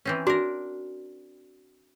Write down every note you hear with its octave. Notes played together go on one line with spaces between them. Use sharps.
E3 C4 C#4
D4 F#4 A#4